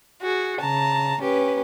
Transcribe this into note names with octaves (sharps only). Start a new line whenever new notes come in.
F#4 G#4
C#3 A5 A#5
C#4 G4 B4